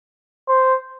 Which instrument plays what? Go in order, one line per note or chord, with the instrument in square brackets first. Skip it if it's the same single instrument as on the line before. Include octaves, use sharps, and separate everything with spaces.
[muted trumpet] C5